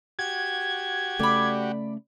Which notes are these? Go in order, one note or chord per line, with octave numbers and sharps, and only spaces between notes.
F#4 G4 G#6
C#3 A3 D5 B5